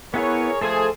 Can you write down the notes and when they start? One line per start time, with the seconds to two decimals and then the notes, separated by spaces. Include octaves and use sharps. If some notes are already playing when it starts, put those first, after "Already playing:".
0.14 B3 E4 G#4 A#4 B4 C#5
0.61 F3 A3 G#4 A4 C5 G#5